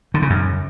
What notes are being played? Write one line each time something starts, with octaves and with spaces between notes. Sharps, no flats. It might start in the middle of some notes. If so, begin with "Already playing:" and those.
D3
C#3
F#2